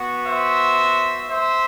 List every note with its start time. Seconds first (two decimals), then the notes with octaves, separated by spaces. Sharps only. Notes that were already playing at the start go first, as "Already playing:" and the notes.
Already playing: B3 F#4
0.26 C5 E5
1.29 C5 E5